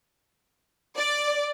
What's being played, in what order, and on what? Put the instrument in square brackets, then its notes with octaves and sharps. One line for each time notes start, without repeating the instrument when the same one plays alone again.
[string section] D5